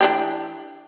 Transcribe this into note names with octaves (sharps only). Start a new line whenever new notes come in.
E3 D4 G4